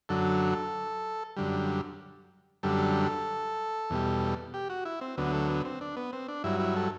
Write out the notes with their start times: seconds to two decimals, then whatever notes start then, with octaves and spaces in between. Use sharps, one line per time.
0.09 F#2 D3 F#3 A4
1.37 F#2 D3 G3
2.63 F#2 D3 G3 A4
3.90 E2 B2 G3
4.54 G4
4.70 F#4
4.85 E4
5.01 C4
5.18 D2 D3 F#3 B3
5.33 A3
5.49 B3
5.65 C4
5.81 D4
5.97 B3
6.13 C4
6.28 D4
6.44 G2 F#3 E4
6.60 E4
6.76 A4